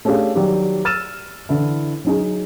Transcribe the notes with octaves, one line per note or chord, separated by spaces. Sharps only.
A3 C#4 D4 G4 G#4 F5
D#3 F#3 G3 G4 D5
E6 F6 A6 D#7 E7
D3 E3 E4
F#3 D#4 G#4